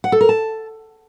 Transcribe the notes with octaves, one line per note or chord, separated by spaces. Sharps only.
F#5
A4
A#4
A5